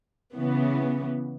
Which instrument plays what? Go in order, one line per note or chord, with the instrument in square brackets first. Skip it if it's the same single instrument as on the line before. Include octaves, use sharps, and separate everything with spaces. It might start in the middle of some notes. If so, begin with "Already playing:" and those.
[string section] C#3 E3 B3